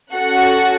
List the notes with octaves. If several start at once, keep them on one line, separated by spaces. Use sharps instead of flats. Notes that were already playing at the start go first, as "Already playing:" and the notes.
C#4 F#4 A4 F#5